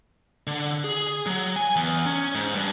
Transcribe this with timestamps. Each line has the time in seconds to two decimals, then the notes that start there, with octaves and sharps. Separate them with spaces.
0.47 D3
0.84 G#4
1.26 F#3
1.56 G#5
1.76 E2
2.06 C#4
2.35 G#2
2.55 G2